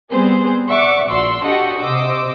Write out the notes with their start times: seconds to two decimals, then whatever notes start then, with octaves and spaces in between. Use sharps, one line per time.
0.11 G3 B3 C4 G#4 C5
0.68 D5 E5 F#5 C#6 D6
1.09 A#1 F#4 D5 C6 E6
1.45 D4 F#4 G4 A4 D#5 F#5
1.79 C3 C5 D#5 D6 E6